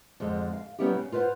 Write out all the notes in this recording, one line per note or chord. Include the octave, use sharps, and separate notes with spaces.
F2 D3 G#3
F5
F#3 G3 B3 C#4 E4 G4
C#3
F4 B4 C5 D#5 F#5